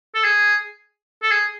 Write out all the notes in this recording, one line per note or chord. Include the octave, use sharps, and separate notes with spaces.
A4
G#4
A4
G#4